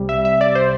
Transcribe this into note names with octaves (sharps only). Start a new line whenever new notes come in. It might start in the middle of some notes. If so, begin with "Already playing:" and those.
Already playing: C2 C3 G3
E5
E5
D5
C5